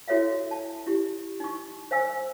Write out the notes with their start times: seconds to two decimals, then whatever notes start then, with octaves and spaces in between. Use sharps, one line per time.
0.08 E4 F#4 A4 C#5 E5 F5
0.51 A5
0.87 E4 G4
1.40 D#4 C#6
1.91 C5 F5 G#5 E6